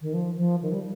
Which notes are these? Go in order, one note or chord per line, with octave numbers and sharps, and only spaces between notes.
D#3
F3
F3
D#3
G3